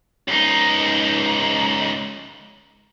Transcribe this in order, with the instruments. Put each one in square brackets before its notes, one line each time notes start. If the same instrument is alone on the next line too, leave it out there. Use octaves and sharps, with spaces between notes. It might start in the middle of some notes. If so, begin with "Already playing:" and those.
[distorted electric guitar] C#2 D#4